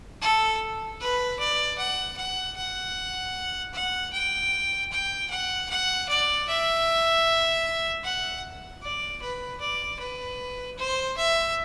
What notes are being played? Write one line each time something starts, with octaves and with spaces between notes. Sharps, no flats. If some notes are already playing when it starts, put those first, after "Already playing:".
A4
B4
D5
F#5
F#5
F#5
F#5
G5
G5
F#5
F#5
D5
E5
F#5
D5
B4
D5
B4
C5
E5